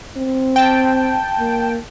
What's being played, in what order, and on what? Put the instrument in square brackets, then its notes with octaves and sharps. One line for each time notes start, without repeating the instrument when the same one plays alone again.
[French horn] C4
[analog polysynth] G5 A5
[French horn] A#3